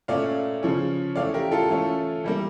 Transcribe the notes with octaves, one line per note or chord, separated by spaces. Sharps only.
A#2 A3 C#4 D5 F5
C#3 F3 C#4
E3 A3 C#4 D5 F5
G4 A#4
F4 A4
E3 A3 C#4
E3 G3 A#3